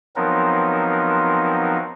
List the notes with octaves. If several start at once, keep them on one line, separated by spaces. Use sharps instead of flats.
F3 F#3 B3 C4 D#4 A#4